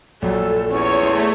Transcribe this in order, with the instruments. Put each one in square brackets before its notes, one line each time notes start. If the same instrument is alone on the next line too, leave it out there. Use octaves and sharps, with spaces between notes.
[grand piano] A#1 F#3 [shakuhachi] A4
[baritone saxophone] E2 [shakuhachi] C#4 [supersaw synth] C#5
[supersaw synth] A3 [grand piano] G#4 C6